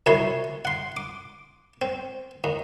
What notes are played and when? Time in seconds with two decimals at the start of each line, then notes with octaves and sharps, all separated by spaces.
0.06 C2 F#2 E4 C#5 C6
0.65 F#5 C6
0.97 D6
1.82 C4
2.44 D#2